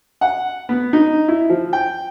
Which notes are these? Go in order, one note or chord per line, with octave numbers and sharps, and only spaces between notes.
F#5
B3
D#4
E4
F3
G5